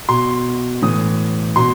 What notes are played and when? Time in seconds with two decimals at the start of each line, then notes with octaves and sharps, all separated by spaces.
0.08 B2 C6
0.82 A2 E3 D#6
1.56 B2 C6